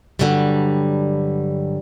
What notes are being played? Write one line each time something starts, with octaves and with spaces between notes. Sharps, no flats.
G2 D3 E3 F#3 G3